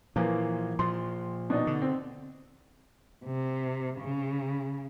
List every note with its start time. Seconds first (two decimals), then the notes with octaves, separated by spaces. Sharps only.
0.16 A#2 E3 F3 A#3
0.79 A#2 F3 C6
1.50 B2 D4 D#4
1.67 D3
1.82 C4
3.25 C3
4.00 C#3